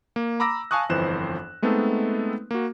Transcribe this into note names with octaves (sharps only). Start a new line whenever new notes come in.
A#3
A#5 B5 D6 E6 A#6
F5 G#5 A5 C#6 D#6 F#6
G1 F2 E3 C5 F#6 E7
G#3 A3 B3 C4 D#4 A4
A#3 F#4